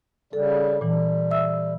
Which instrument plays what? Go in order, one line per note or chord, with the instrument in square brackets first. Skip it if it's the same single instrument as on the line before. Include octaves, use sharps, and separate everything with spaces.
[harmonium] C#3 G3 [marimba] A4
[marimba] A#2 E3 [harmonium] G3
[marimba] E5 E6